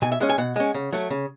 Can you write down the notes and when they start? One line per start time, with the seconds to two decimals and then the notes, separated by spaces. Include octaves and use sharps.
0.02 B2 G#5
0.12 E5
0.20 G#3 C#4 F#5
0.29 G#5
0.38 B2 F#5
0.56 G#3 C#4
0.74 C#3
0.93 F#3 A3
1.10 C#3